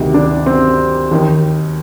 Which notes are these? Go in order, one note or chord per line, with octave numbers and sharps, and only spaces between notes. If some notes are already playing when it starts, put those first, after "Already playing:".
Already playing: D2 C3 D#3
D4
C4
D#2 D#3